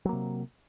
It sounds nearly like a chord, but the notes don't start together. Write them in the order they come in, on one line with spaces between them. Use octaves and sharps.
F#3 A#3 C3